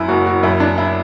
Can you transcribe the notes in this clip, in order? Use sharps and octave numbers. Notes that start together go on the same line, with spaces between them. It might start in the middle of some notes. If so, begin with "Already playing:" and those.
Already playing: F#2 E4
F#1 F#4
F#4
F#2 E4
D4
E4